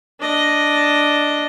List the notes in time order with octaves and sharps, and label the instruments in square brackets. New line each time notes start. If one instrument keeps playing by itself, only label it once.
[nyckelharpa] D4 D#5